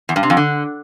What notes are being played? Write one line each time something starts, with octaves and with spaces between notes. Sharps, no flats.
E2
G2
C3
F2
D3